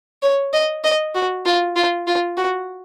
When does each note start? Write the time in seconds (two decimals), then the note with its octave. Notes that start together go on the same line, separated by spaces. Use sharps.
0.22 C#5
0.53 D#5
0.84 D#5
1.15 F#4
1.45 F4
1.76 F4
2.07 F4
2.37 F#4